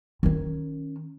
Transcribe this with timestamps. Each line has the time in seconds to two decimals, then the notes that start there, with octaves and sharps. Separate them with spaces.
0.23 D#3 C#4